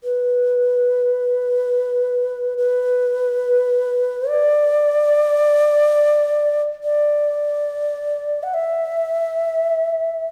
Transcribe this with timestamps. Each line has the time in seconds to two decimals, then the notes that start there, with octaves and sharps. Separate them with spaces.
0.04 B4
2.58 B4
4.28 D5
6.84 D5
8.43 F#5
8.54 E5